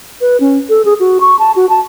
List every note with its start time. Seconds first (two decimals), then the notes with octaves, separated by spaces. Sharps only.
0.21 B4
0.40 C#4
0.69 A4
0.85 G#4
1.00 F#4
1.21 C#6
1.39 A5
1.56 F#4
1.69 A5